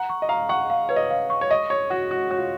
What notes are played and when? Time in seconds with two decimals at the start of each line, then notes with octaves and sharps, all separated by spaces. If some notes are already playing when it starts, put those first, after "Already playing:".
Already playing: F#5 A#5
0.10 C#6
0.22 D#5
0.29 F5 A#5
0.49 F#5 C#6
0.70 F5
0.89 B4 C#5
0.96 D#5
1.11 F5
1.30 C#6
1.41 C#5
1.50 D#5 C#6
1.70 C#5 C#6
1.90 F#4 F#5
2.11 F#4 C#6
2.30 F#4 C#5
2.38 F4